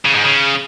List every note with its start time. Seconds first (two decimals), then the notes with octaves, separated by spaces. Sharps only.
0.05 C#3
0.14 G#2
0.24 C#3